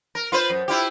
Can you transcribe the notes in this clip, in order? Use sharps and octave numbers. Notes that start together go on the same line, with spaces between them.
A#4
F4 B4 C5
F#2
E4 F4 G4